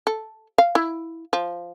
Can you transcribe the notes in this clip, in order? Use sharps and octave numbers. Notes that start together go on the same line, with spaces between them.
A4
F5
E4
F3